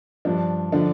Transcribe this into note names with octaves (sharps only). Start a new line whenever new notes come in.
G2 F3 D4
D3 F3 D4